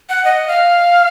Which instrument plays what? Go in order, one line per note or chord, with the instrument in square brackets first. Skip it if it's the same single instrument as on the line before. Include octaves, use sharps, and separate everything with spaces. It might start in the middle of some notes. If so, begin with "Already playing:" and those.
[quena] F#5
D#5
F5